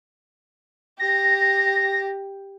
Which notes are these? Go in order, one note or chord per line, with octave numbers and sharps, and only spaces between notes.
G4 A#6